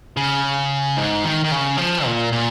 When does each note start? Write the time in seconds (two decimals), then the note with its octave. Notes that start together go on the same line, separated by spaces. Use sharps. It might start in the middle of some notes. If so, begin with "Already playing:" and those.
0.17 C#3
0.97 G#2
1.24 D#3
1.44 D#3
1.52 C#3
1.77 F3
2.06 A#2
2.33 A#2